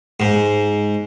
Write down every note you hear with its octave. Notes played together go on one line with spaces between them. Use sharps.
G#2